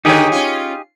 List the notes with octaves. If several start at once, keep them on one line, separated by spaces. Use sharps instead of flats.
D3 D#3 D#4 G4 G#4 C#5
C#4 F4